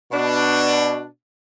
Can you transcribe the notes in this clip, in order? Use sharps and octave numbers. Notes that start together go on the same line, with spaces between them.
B2 D4